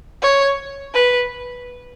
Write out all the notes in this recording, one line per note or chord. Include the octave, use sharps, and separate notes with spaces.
C#5
B4